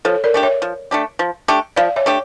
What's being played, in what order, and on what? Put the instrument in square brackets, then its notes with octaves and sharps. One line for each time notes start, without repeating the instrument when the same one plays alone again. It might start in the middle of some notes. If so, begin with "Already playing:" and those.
[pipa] F3 [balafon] A4 C#5
[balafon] A#4 D5
[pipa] A3 D4 G4
[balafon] C#5 E5
[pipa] F3
A3 D4 G4
F3
A3 D4 G4
[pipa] F3 [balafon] D5 F5
[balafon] C#5 E5
[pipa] A3 D4 G4